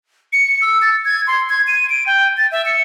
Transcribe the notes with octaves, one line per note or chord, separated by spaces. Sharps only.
C#7
E6
A6
G#6
C6
G#6
D#7
D7
G5
A6
E5
C#7